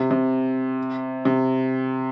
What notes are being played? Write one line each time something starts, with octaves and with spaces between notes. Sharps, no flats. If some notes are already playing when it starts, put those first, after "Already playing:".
Already playing: C3
C3
C3